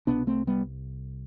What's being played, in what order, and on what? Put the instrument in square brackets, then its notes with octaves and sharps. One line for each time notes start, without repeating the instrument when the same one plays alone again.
[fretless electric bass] C2 B2 B3 D4
A3 C4
G3 B3